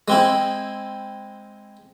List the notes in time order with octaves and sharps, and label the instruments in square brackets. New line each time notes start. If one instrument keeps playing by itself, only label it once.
[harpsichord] G#3 C4 E4